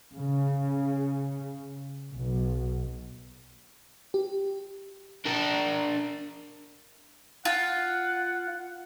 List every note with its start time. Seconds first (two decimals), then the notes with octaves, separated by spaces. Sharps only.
0.14 C#3
2.14 B1
4.14 G4
5.26 D4 A#4
7.45 F4 F#5